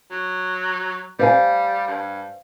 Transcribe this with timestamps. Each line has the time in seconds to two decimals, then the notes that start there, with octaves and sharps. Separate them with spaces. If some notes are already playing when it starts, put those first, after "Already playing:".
0.11 F#3
1.19 G3 C5 F5 G#5
1.87 G2